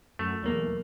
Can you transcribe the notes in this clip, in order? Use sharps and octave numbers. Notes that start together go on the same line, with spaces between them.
F#2 A3
B1 E2 A#3